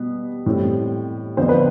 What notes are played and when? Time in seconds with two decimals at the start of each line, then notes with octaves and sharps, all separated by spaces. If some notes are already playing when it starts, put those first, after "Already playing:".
Already playing: B2 G3 B3
0.46 A2 G3 C4
1.37 F2 D3 F3 B3 C5
1.49 B4